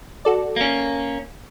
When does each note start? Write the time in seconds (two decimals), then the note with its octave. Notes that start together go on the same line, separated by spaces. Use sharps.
0.25 F#4 A4 D5
0.56 A#3 C#4